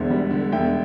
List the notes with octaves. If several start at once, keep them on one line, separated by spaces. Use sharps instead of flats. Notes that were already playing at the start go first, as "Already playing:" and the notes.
Already playing: E1 E2 D3 C5 E5
G3
D3
E1 E5 G5